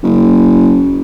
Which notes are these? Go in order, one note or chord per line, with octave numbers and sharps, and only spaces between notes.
F#1